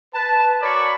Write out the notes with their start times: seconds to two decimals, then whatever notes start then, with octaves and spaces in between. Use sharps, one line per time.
0.14 B4 A5
0.61 F#4 A#4 C#5 D5 B5 C#6